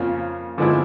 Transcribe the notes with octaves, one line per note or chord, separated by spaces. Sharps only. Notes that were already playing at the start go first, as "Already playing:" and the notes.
Already playing: F2 C#3 F3 A#3 C#4
D3 F3 G#3 C4 E4